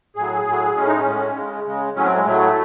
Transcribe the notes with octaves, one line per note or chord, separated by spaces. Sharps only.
A2 F#3 G#4
A2 F#3
A2 G#3 C#4
D#4
C#4
A2 G#3
C#3 G#3
C#3 G#3
A2 F#3 C#4
C4
G#3
A2 F#3 A3